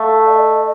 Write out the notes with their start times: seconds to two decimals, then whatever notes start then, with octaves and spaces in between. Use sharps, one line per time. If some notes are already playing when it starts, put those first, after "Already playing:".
Already playing: A3 F5
0.26 D5
0.34 D#5